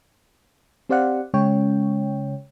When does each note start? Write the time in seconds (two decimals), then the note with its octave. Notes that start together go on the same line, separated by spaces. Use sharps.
0.89 C4 G4 C5 D5 F5 F#5
1.34 C#3 G#3 C#4 C#5 G5